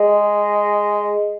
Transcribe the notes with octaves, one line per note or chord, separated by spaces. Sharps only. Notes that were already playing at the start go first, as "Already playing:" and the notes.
Already playing: G#3